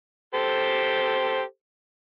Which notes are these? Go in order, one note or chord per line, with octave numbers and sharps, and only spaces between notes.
G4 A4 C5